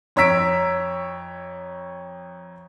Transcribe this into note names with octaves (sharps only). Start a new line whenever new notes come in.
F2 C#5 A#5 E6 B6 D7